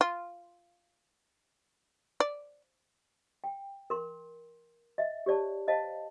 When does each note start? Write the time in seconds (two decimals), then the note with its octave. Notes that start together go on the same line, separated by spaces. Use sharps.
0.01 F4
2.20 D5
3.44 G5
3.90 A#4 C6
4.98 D#5 E5
5.26 G4 C#5 D5 A5
5.67 B4 C5 D#5 F5 A5